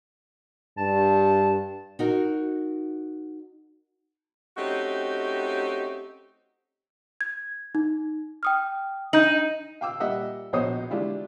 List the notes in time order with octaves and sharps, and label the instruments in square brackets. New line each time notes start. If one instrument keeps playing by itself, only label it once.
[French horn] G2 [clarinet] A5
[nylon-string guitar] D#4 F#4 A#4
[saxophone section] A3 C4 C#4 D#4 F#4 G4
[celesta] G#6
D#4
G5 D#6 F6
[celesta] D4 G6 F#7 [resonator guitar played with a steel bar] D#4
[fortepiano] F5 G5 D6 E6
A#2 G3 D#5 E5 F#5
A#1 B2 C5 C#5 D#5 D#6
G#3 D4 E4 F4 G4